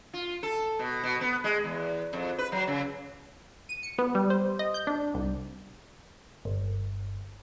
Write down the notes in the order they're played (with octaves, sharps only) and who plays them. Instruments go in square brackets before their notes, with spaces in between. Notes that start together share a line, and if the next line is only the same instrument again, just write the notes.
[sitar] F4
A4
B2
B2
B3
G#3
E2
F2
B4
F#3
C#3
[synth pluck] D#7
C#7
B3
G3
C5
D#5
G6
D4
C2
[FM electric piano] G1